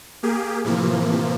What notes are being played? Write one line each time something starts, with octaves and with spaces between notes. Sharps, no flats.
A#3 G4 G#4
A2 C3 E3 F3 A#3